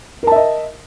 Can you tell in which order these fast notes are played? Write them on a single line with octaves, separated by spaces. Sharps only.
A#4 A5 E5 D#5